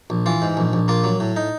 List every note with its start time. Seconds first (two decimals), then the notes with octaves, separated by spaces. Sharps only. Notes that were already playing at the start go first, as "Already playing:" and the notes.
0.10 A#1
0.26 E3 F4
0.42 G#2
0.57 A#1
0.73 A#1
0.88 A#3 F4
1.04 F#3
1.20 A2
1.36 D#4